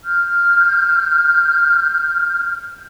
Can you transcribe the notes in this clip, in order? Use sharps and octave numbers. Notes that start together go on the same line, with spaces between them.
F6 G6